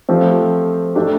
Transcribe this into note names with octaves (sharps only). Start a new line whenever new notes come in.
F3 A3 C4 G4
A3 D4 G4